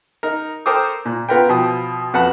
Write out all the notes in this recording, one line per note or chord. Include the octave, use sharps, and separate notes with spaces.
D#4 A#4
A4 A#4 C5 G5 D6 D#6
A#2
B3 F4 A#4 B4 G5
B2 F3 G5 D#6
F2 F#4 B4 F#5 A5 F#6